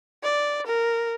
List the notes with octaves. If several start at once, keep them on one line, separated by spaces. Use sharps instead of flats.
D5
A#4